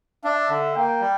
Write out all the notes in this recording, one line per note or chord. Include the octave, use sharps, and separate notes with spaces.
D4 E5
D3
A#3 G5
G3